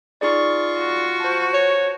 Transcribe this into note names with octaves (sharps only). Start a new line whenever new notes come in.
D#4 F4 G#4 D5 C#6
F#4
C5 A5
C#5